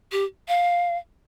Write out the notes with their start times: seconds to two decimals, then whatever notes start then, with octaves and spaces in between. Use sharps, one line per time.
0.12 G4
0.48 F5